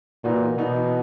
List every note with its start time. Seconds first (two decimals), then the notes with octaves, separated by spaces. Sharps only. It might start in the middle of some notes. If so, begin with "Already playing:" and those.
0.24 A#2 E3 B3 D#4 F#4
0.57 B2 E3 B3 D#4 F#4